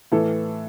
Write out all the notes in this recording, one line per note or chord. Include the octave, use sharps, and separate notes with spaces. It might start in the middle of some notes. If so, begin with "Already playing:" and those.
A2 E3 A4